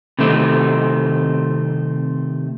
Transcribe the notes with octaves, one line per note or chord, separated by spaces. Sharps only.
C3 D#3 A3 C4